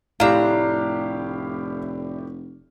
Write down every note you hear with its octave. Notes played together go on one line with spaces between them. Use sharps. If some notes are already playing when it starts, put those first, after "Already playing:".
F1 A2 D4 E4 G4 F5 A#5 E7